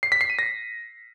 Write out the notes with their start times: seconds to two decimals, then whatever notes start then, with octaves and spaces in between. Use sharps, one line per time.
0.03 C7
0.12 B6
0.21 C7
0.30 D#7
0.39 A#6